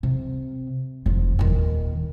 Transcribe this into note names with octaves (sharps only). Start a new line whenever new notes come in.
C3
F1 F3
D#1 D#3